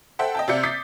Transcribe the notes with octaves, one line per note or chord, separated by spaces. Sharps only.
A4 C5 E5 F#5 G5
D#5 G5 A5
C3 F4 D5 E5 G6 C#7
D6 D#6 G6 A6 B6 C7